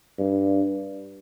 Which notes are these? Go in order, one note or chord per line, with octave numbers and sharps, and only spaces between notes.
G2